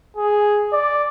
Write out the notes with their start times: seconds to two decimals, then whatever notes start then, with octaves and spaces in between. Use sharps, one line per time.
0.17 G#4
0.73 D5